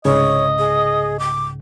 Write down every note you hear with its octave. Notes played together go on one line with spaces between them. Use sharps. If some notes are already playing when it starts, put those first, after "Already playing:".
C2 G#2 C#3 C#5 D#5
G#4
D6